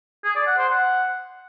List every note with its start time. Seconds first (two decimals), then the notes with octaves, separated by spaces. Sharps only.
0.24 G#4
0.36 D5
0.47 F#5
0.58 C5
0.69 F#5